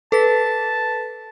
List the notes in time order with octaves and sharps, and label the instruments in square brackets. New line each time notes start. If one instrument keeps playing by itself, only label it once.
[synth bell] A4 B4 B6 [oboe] A5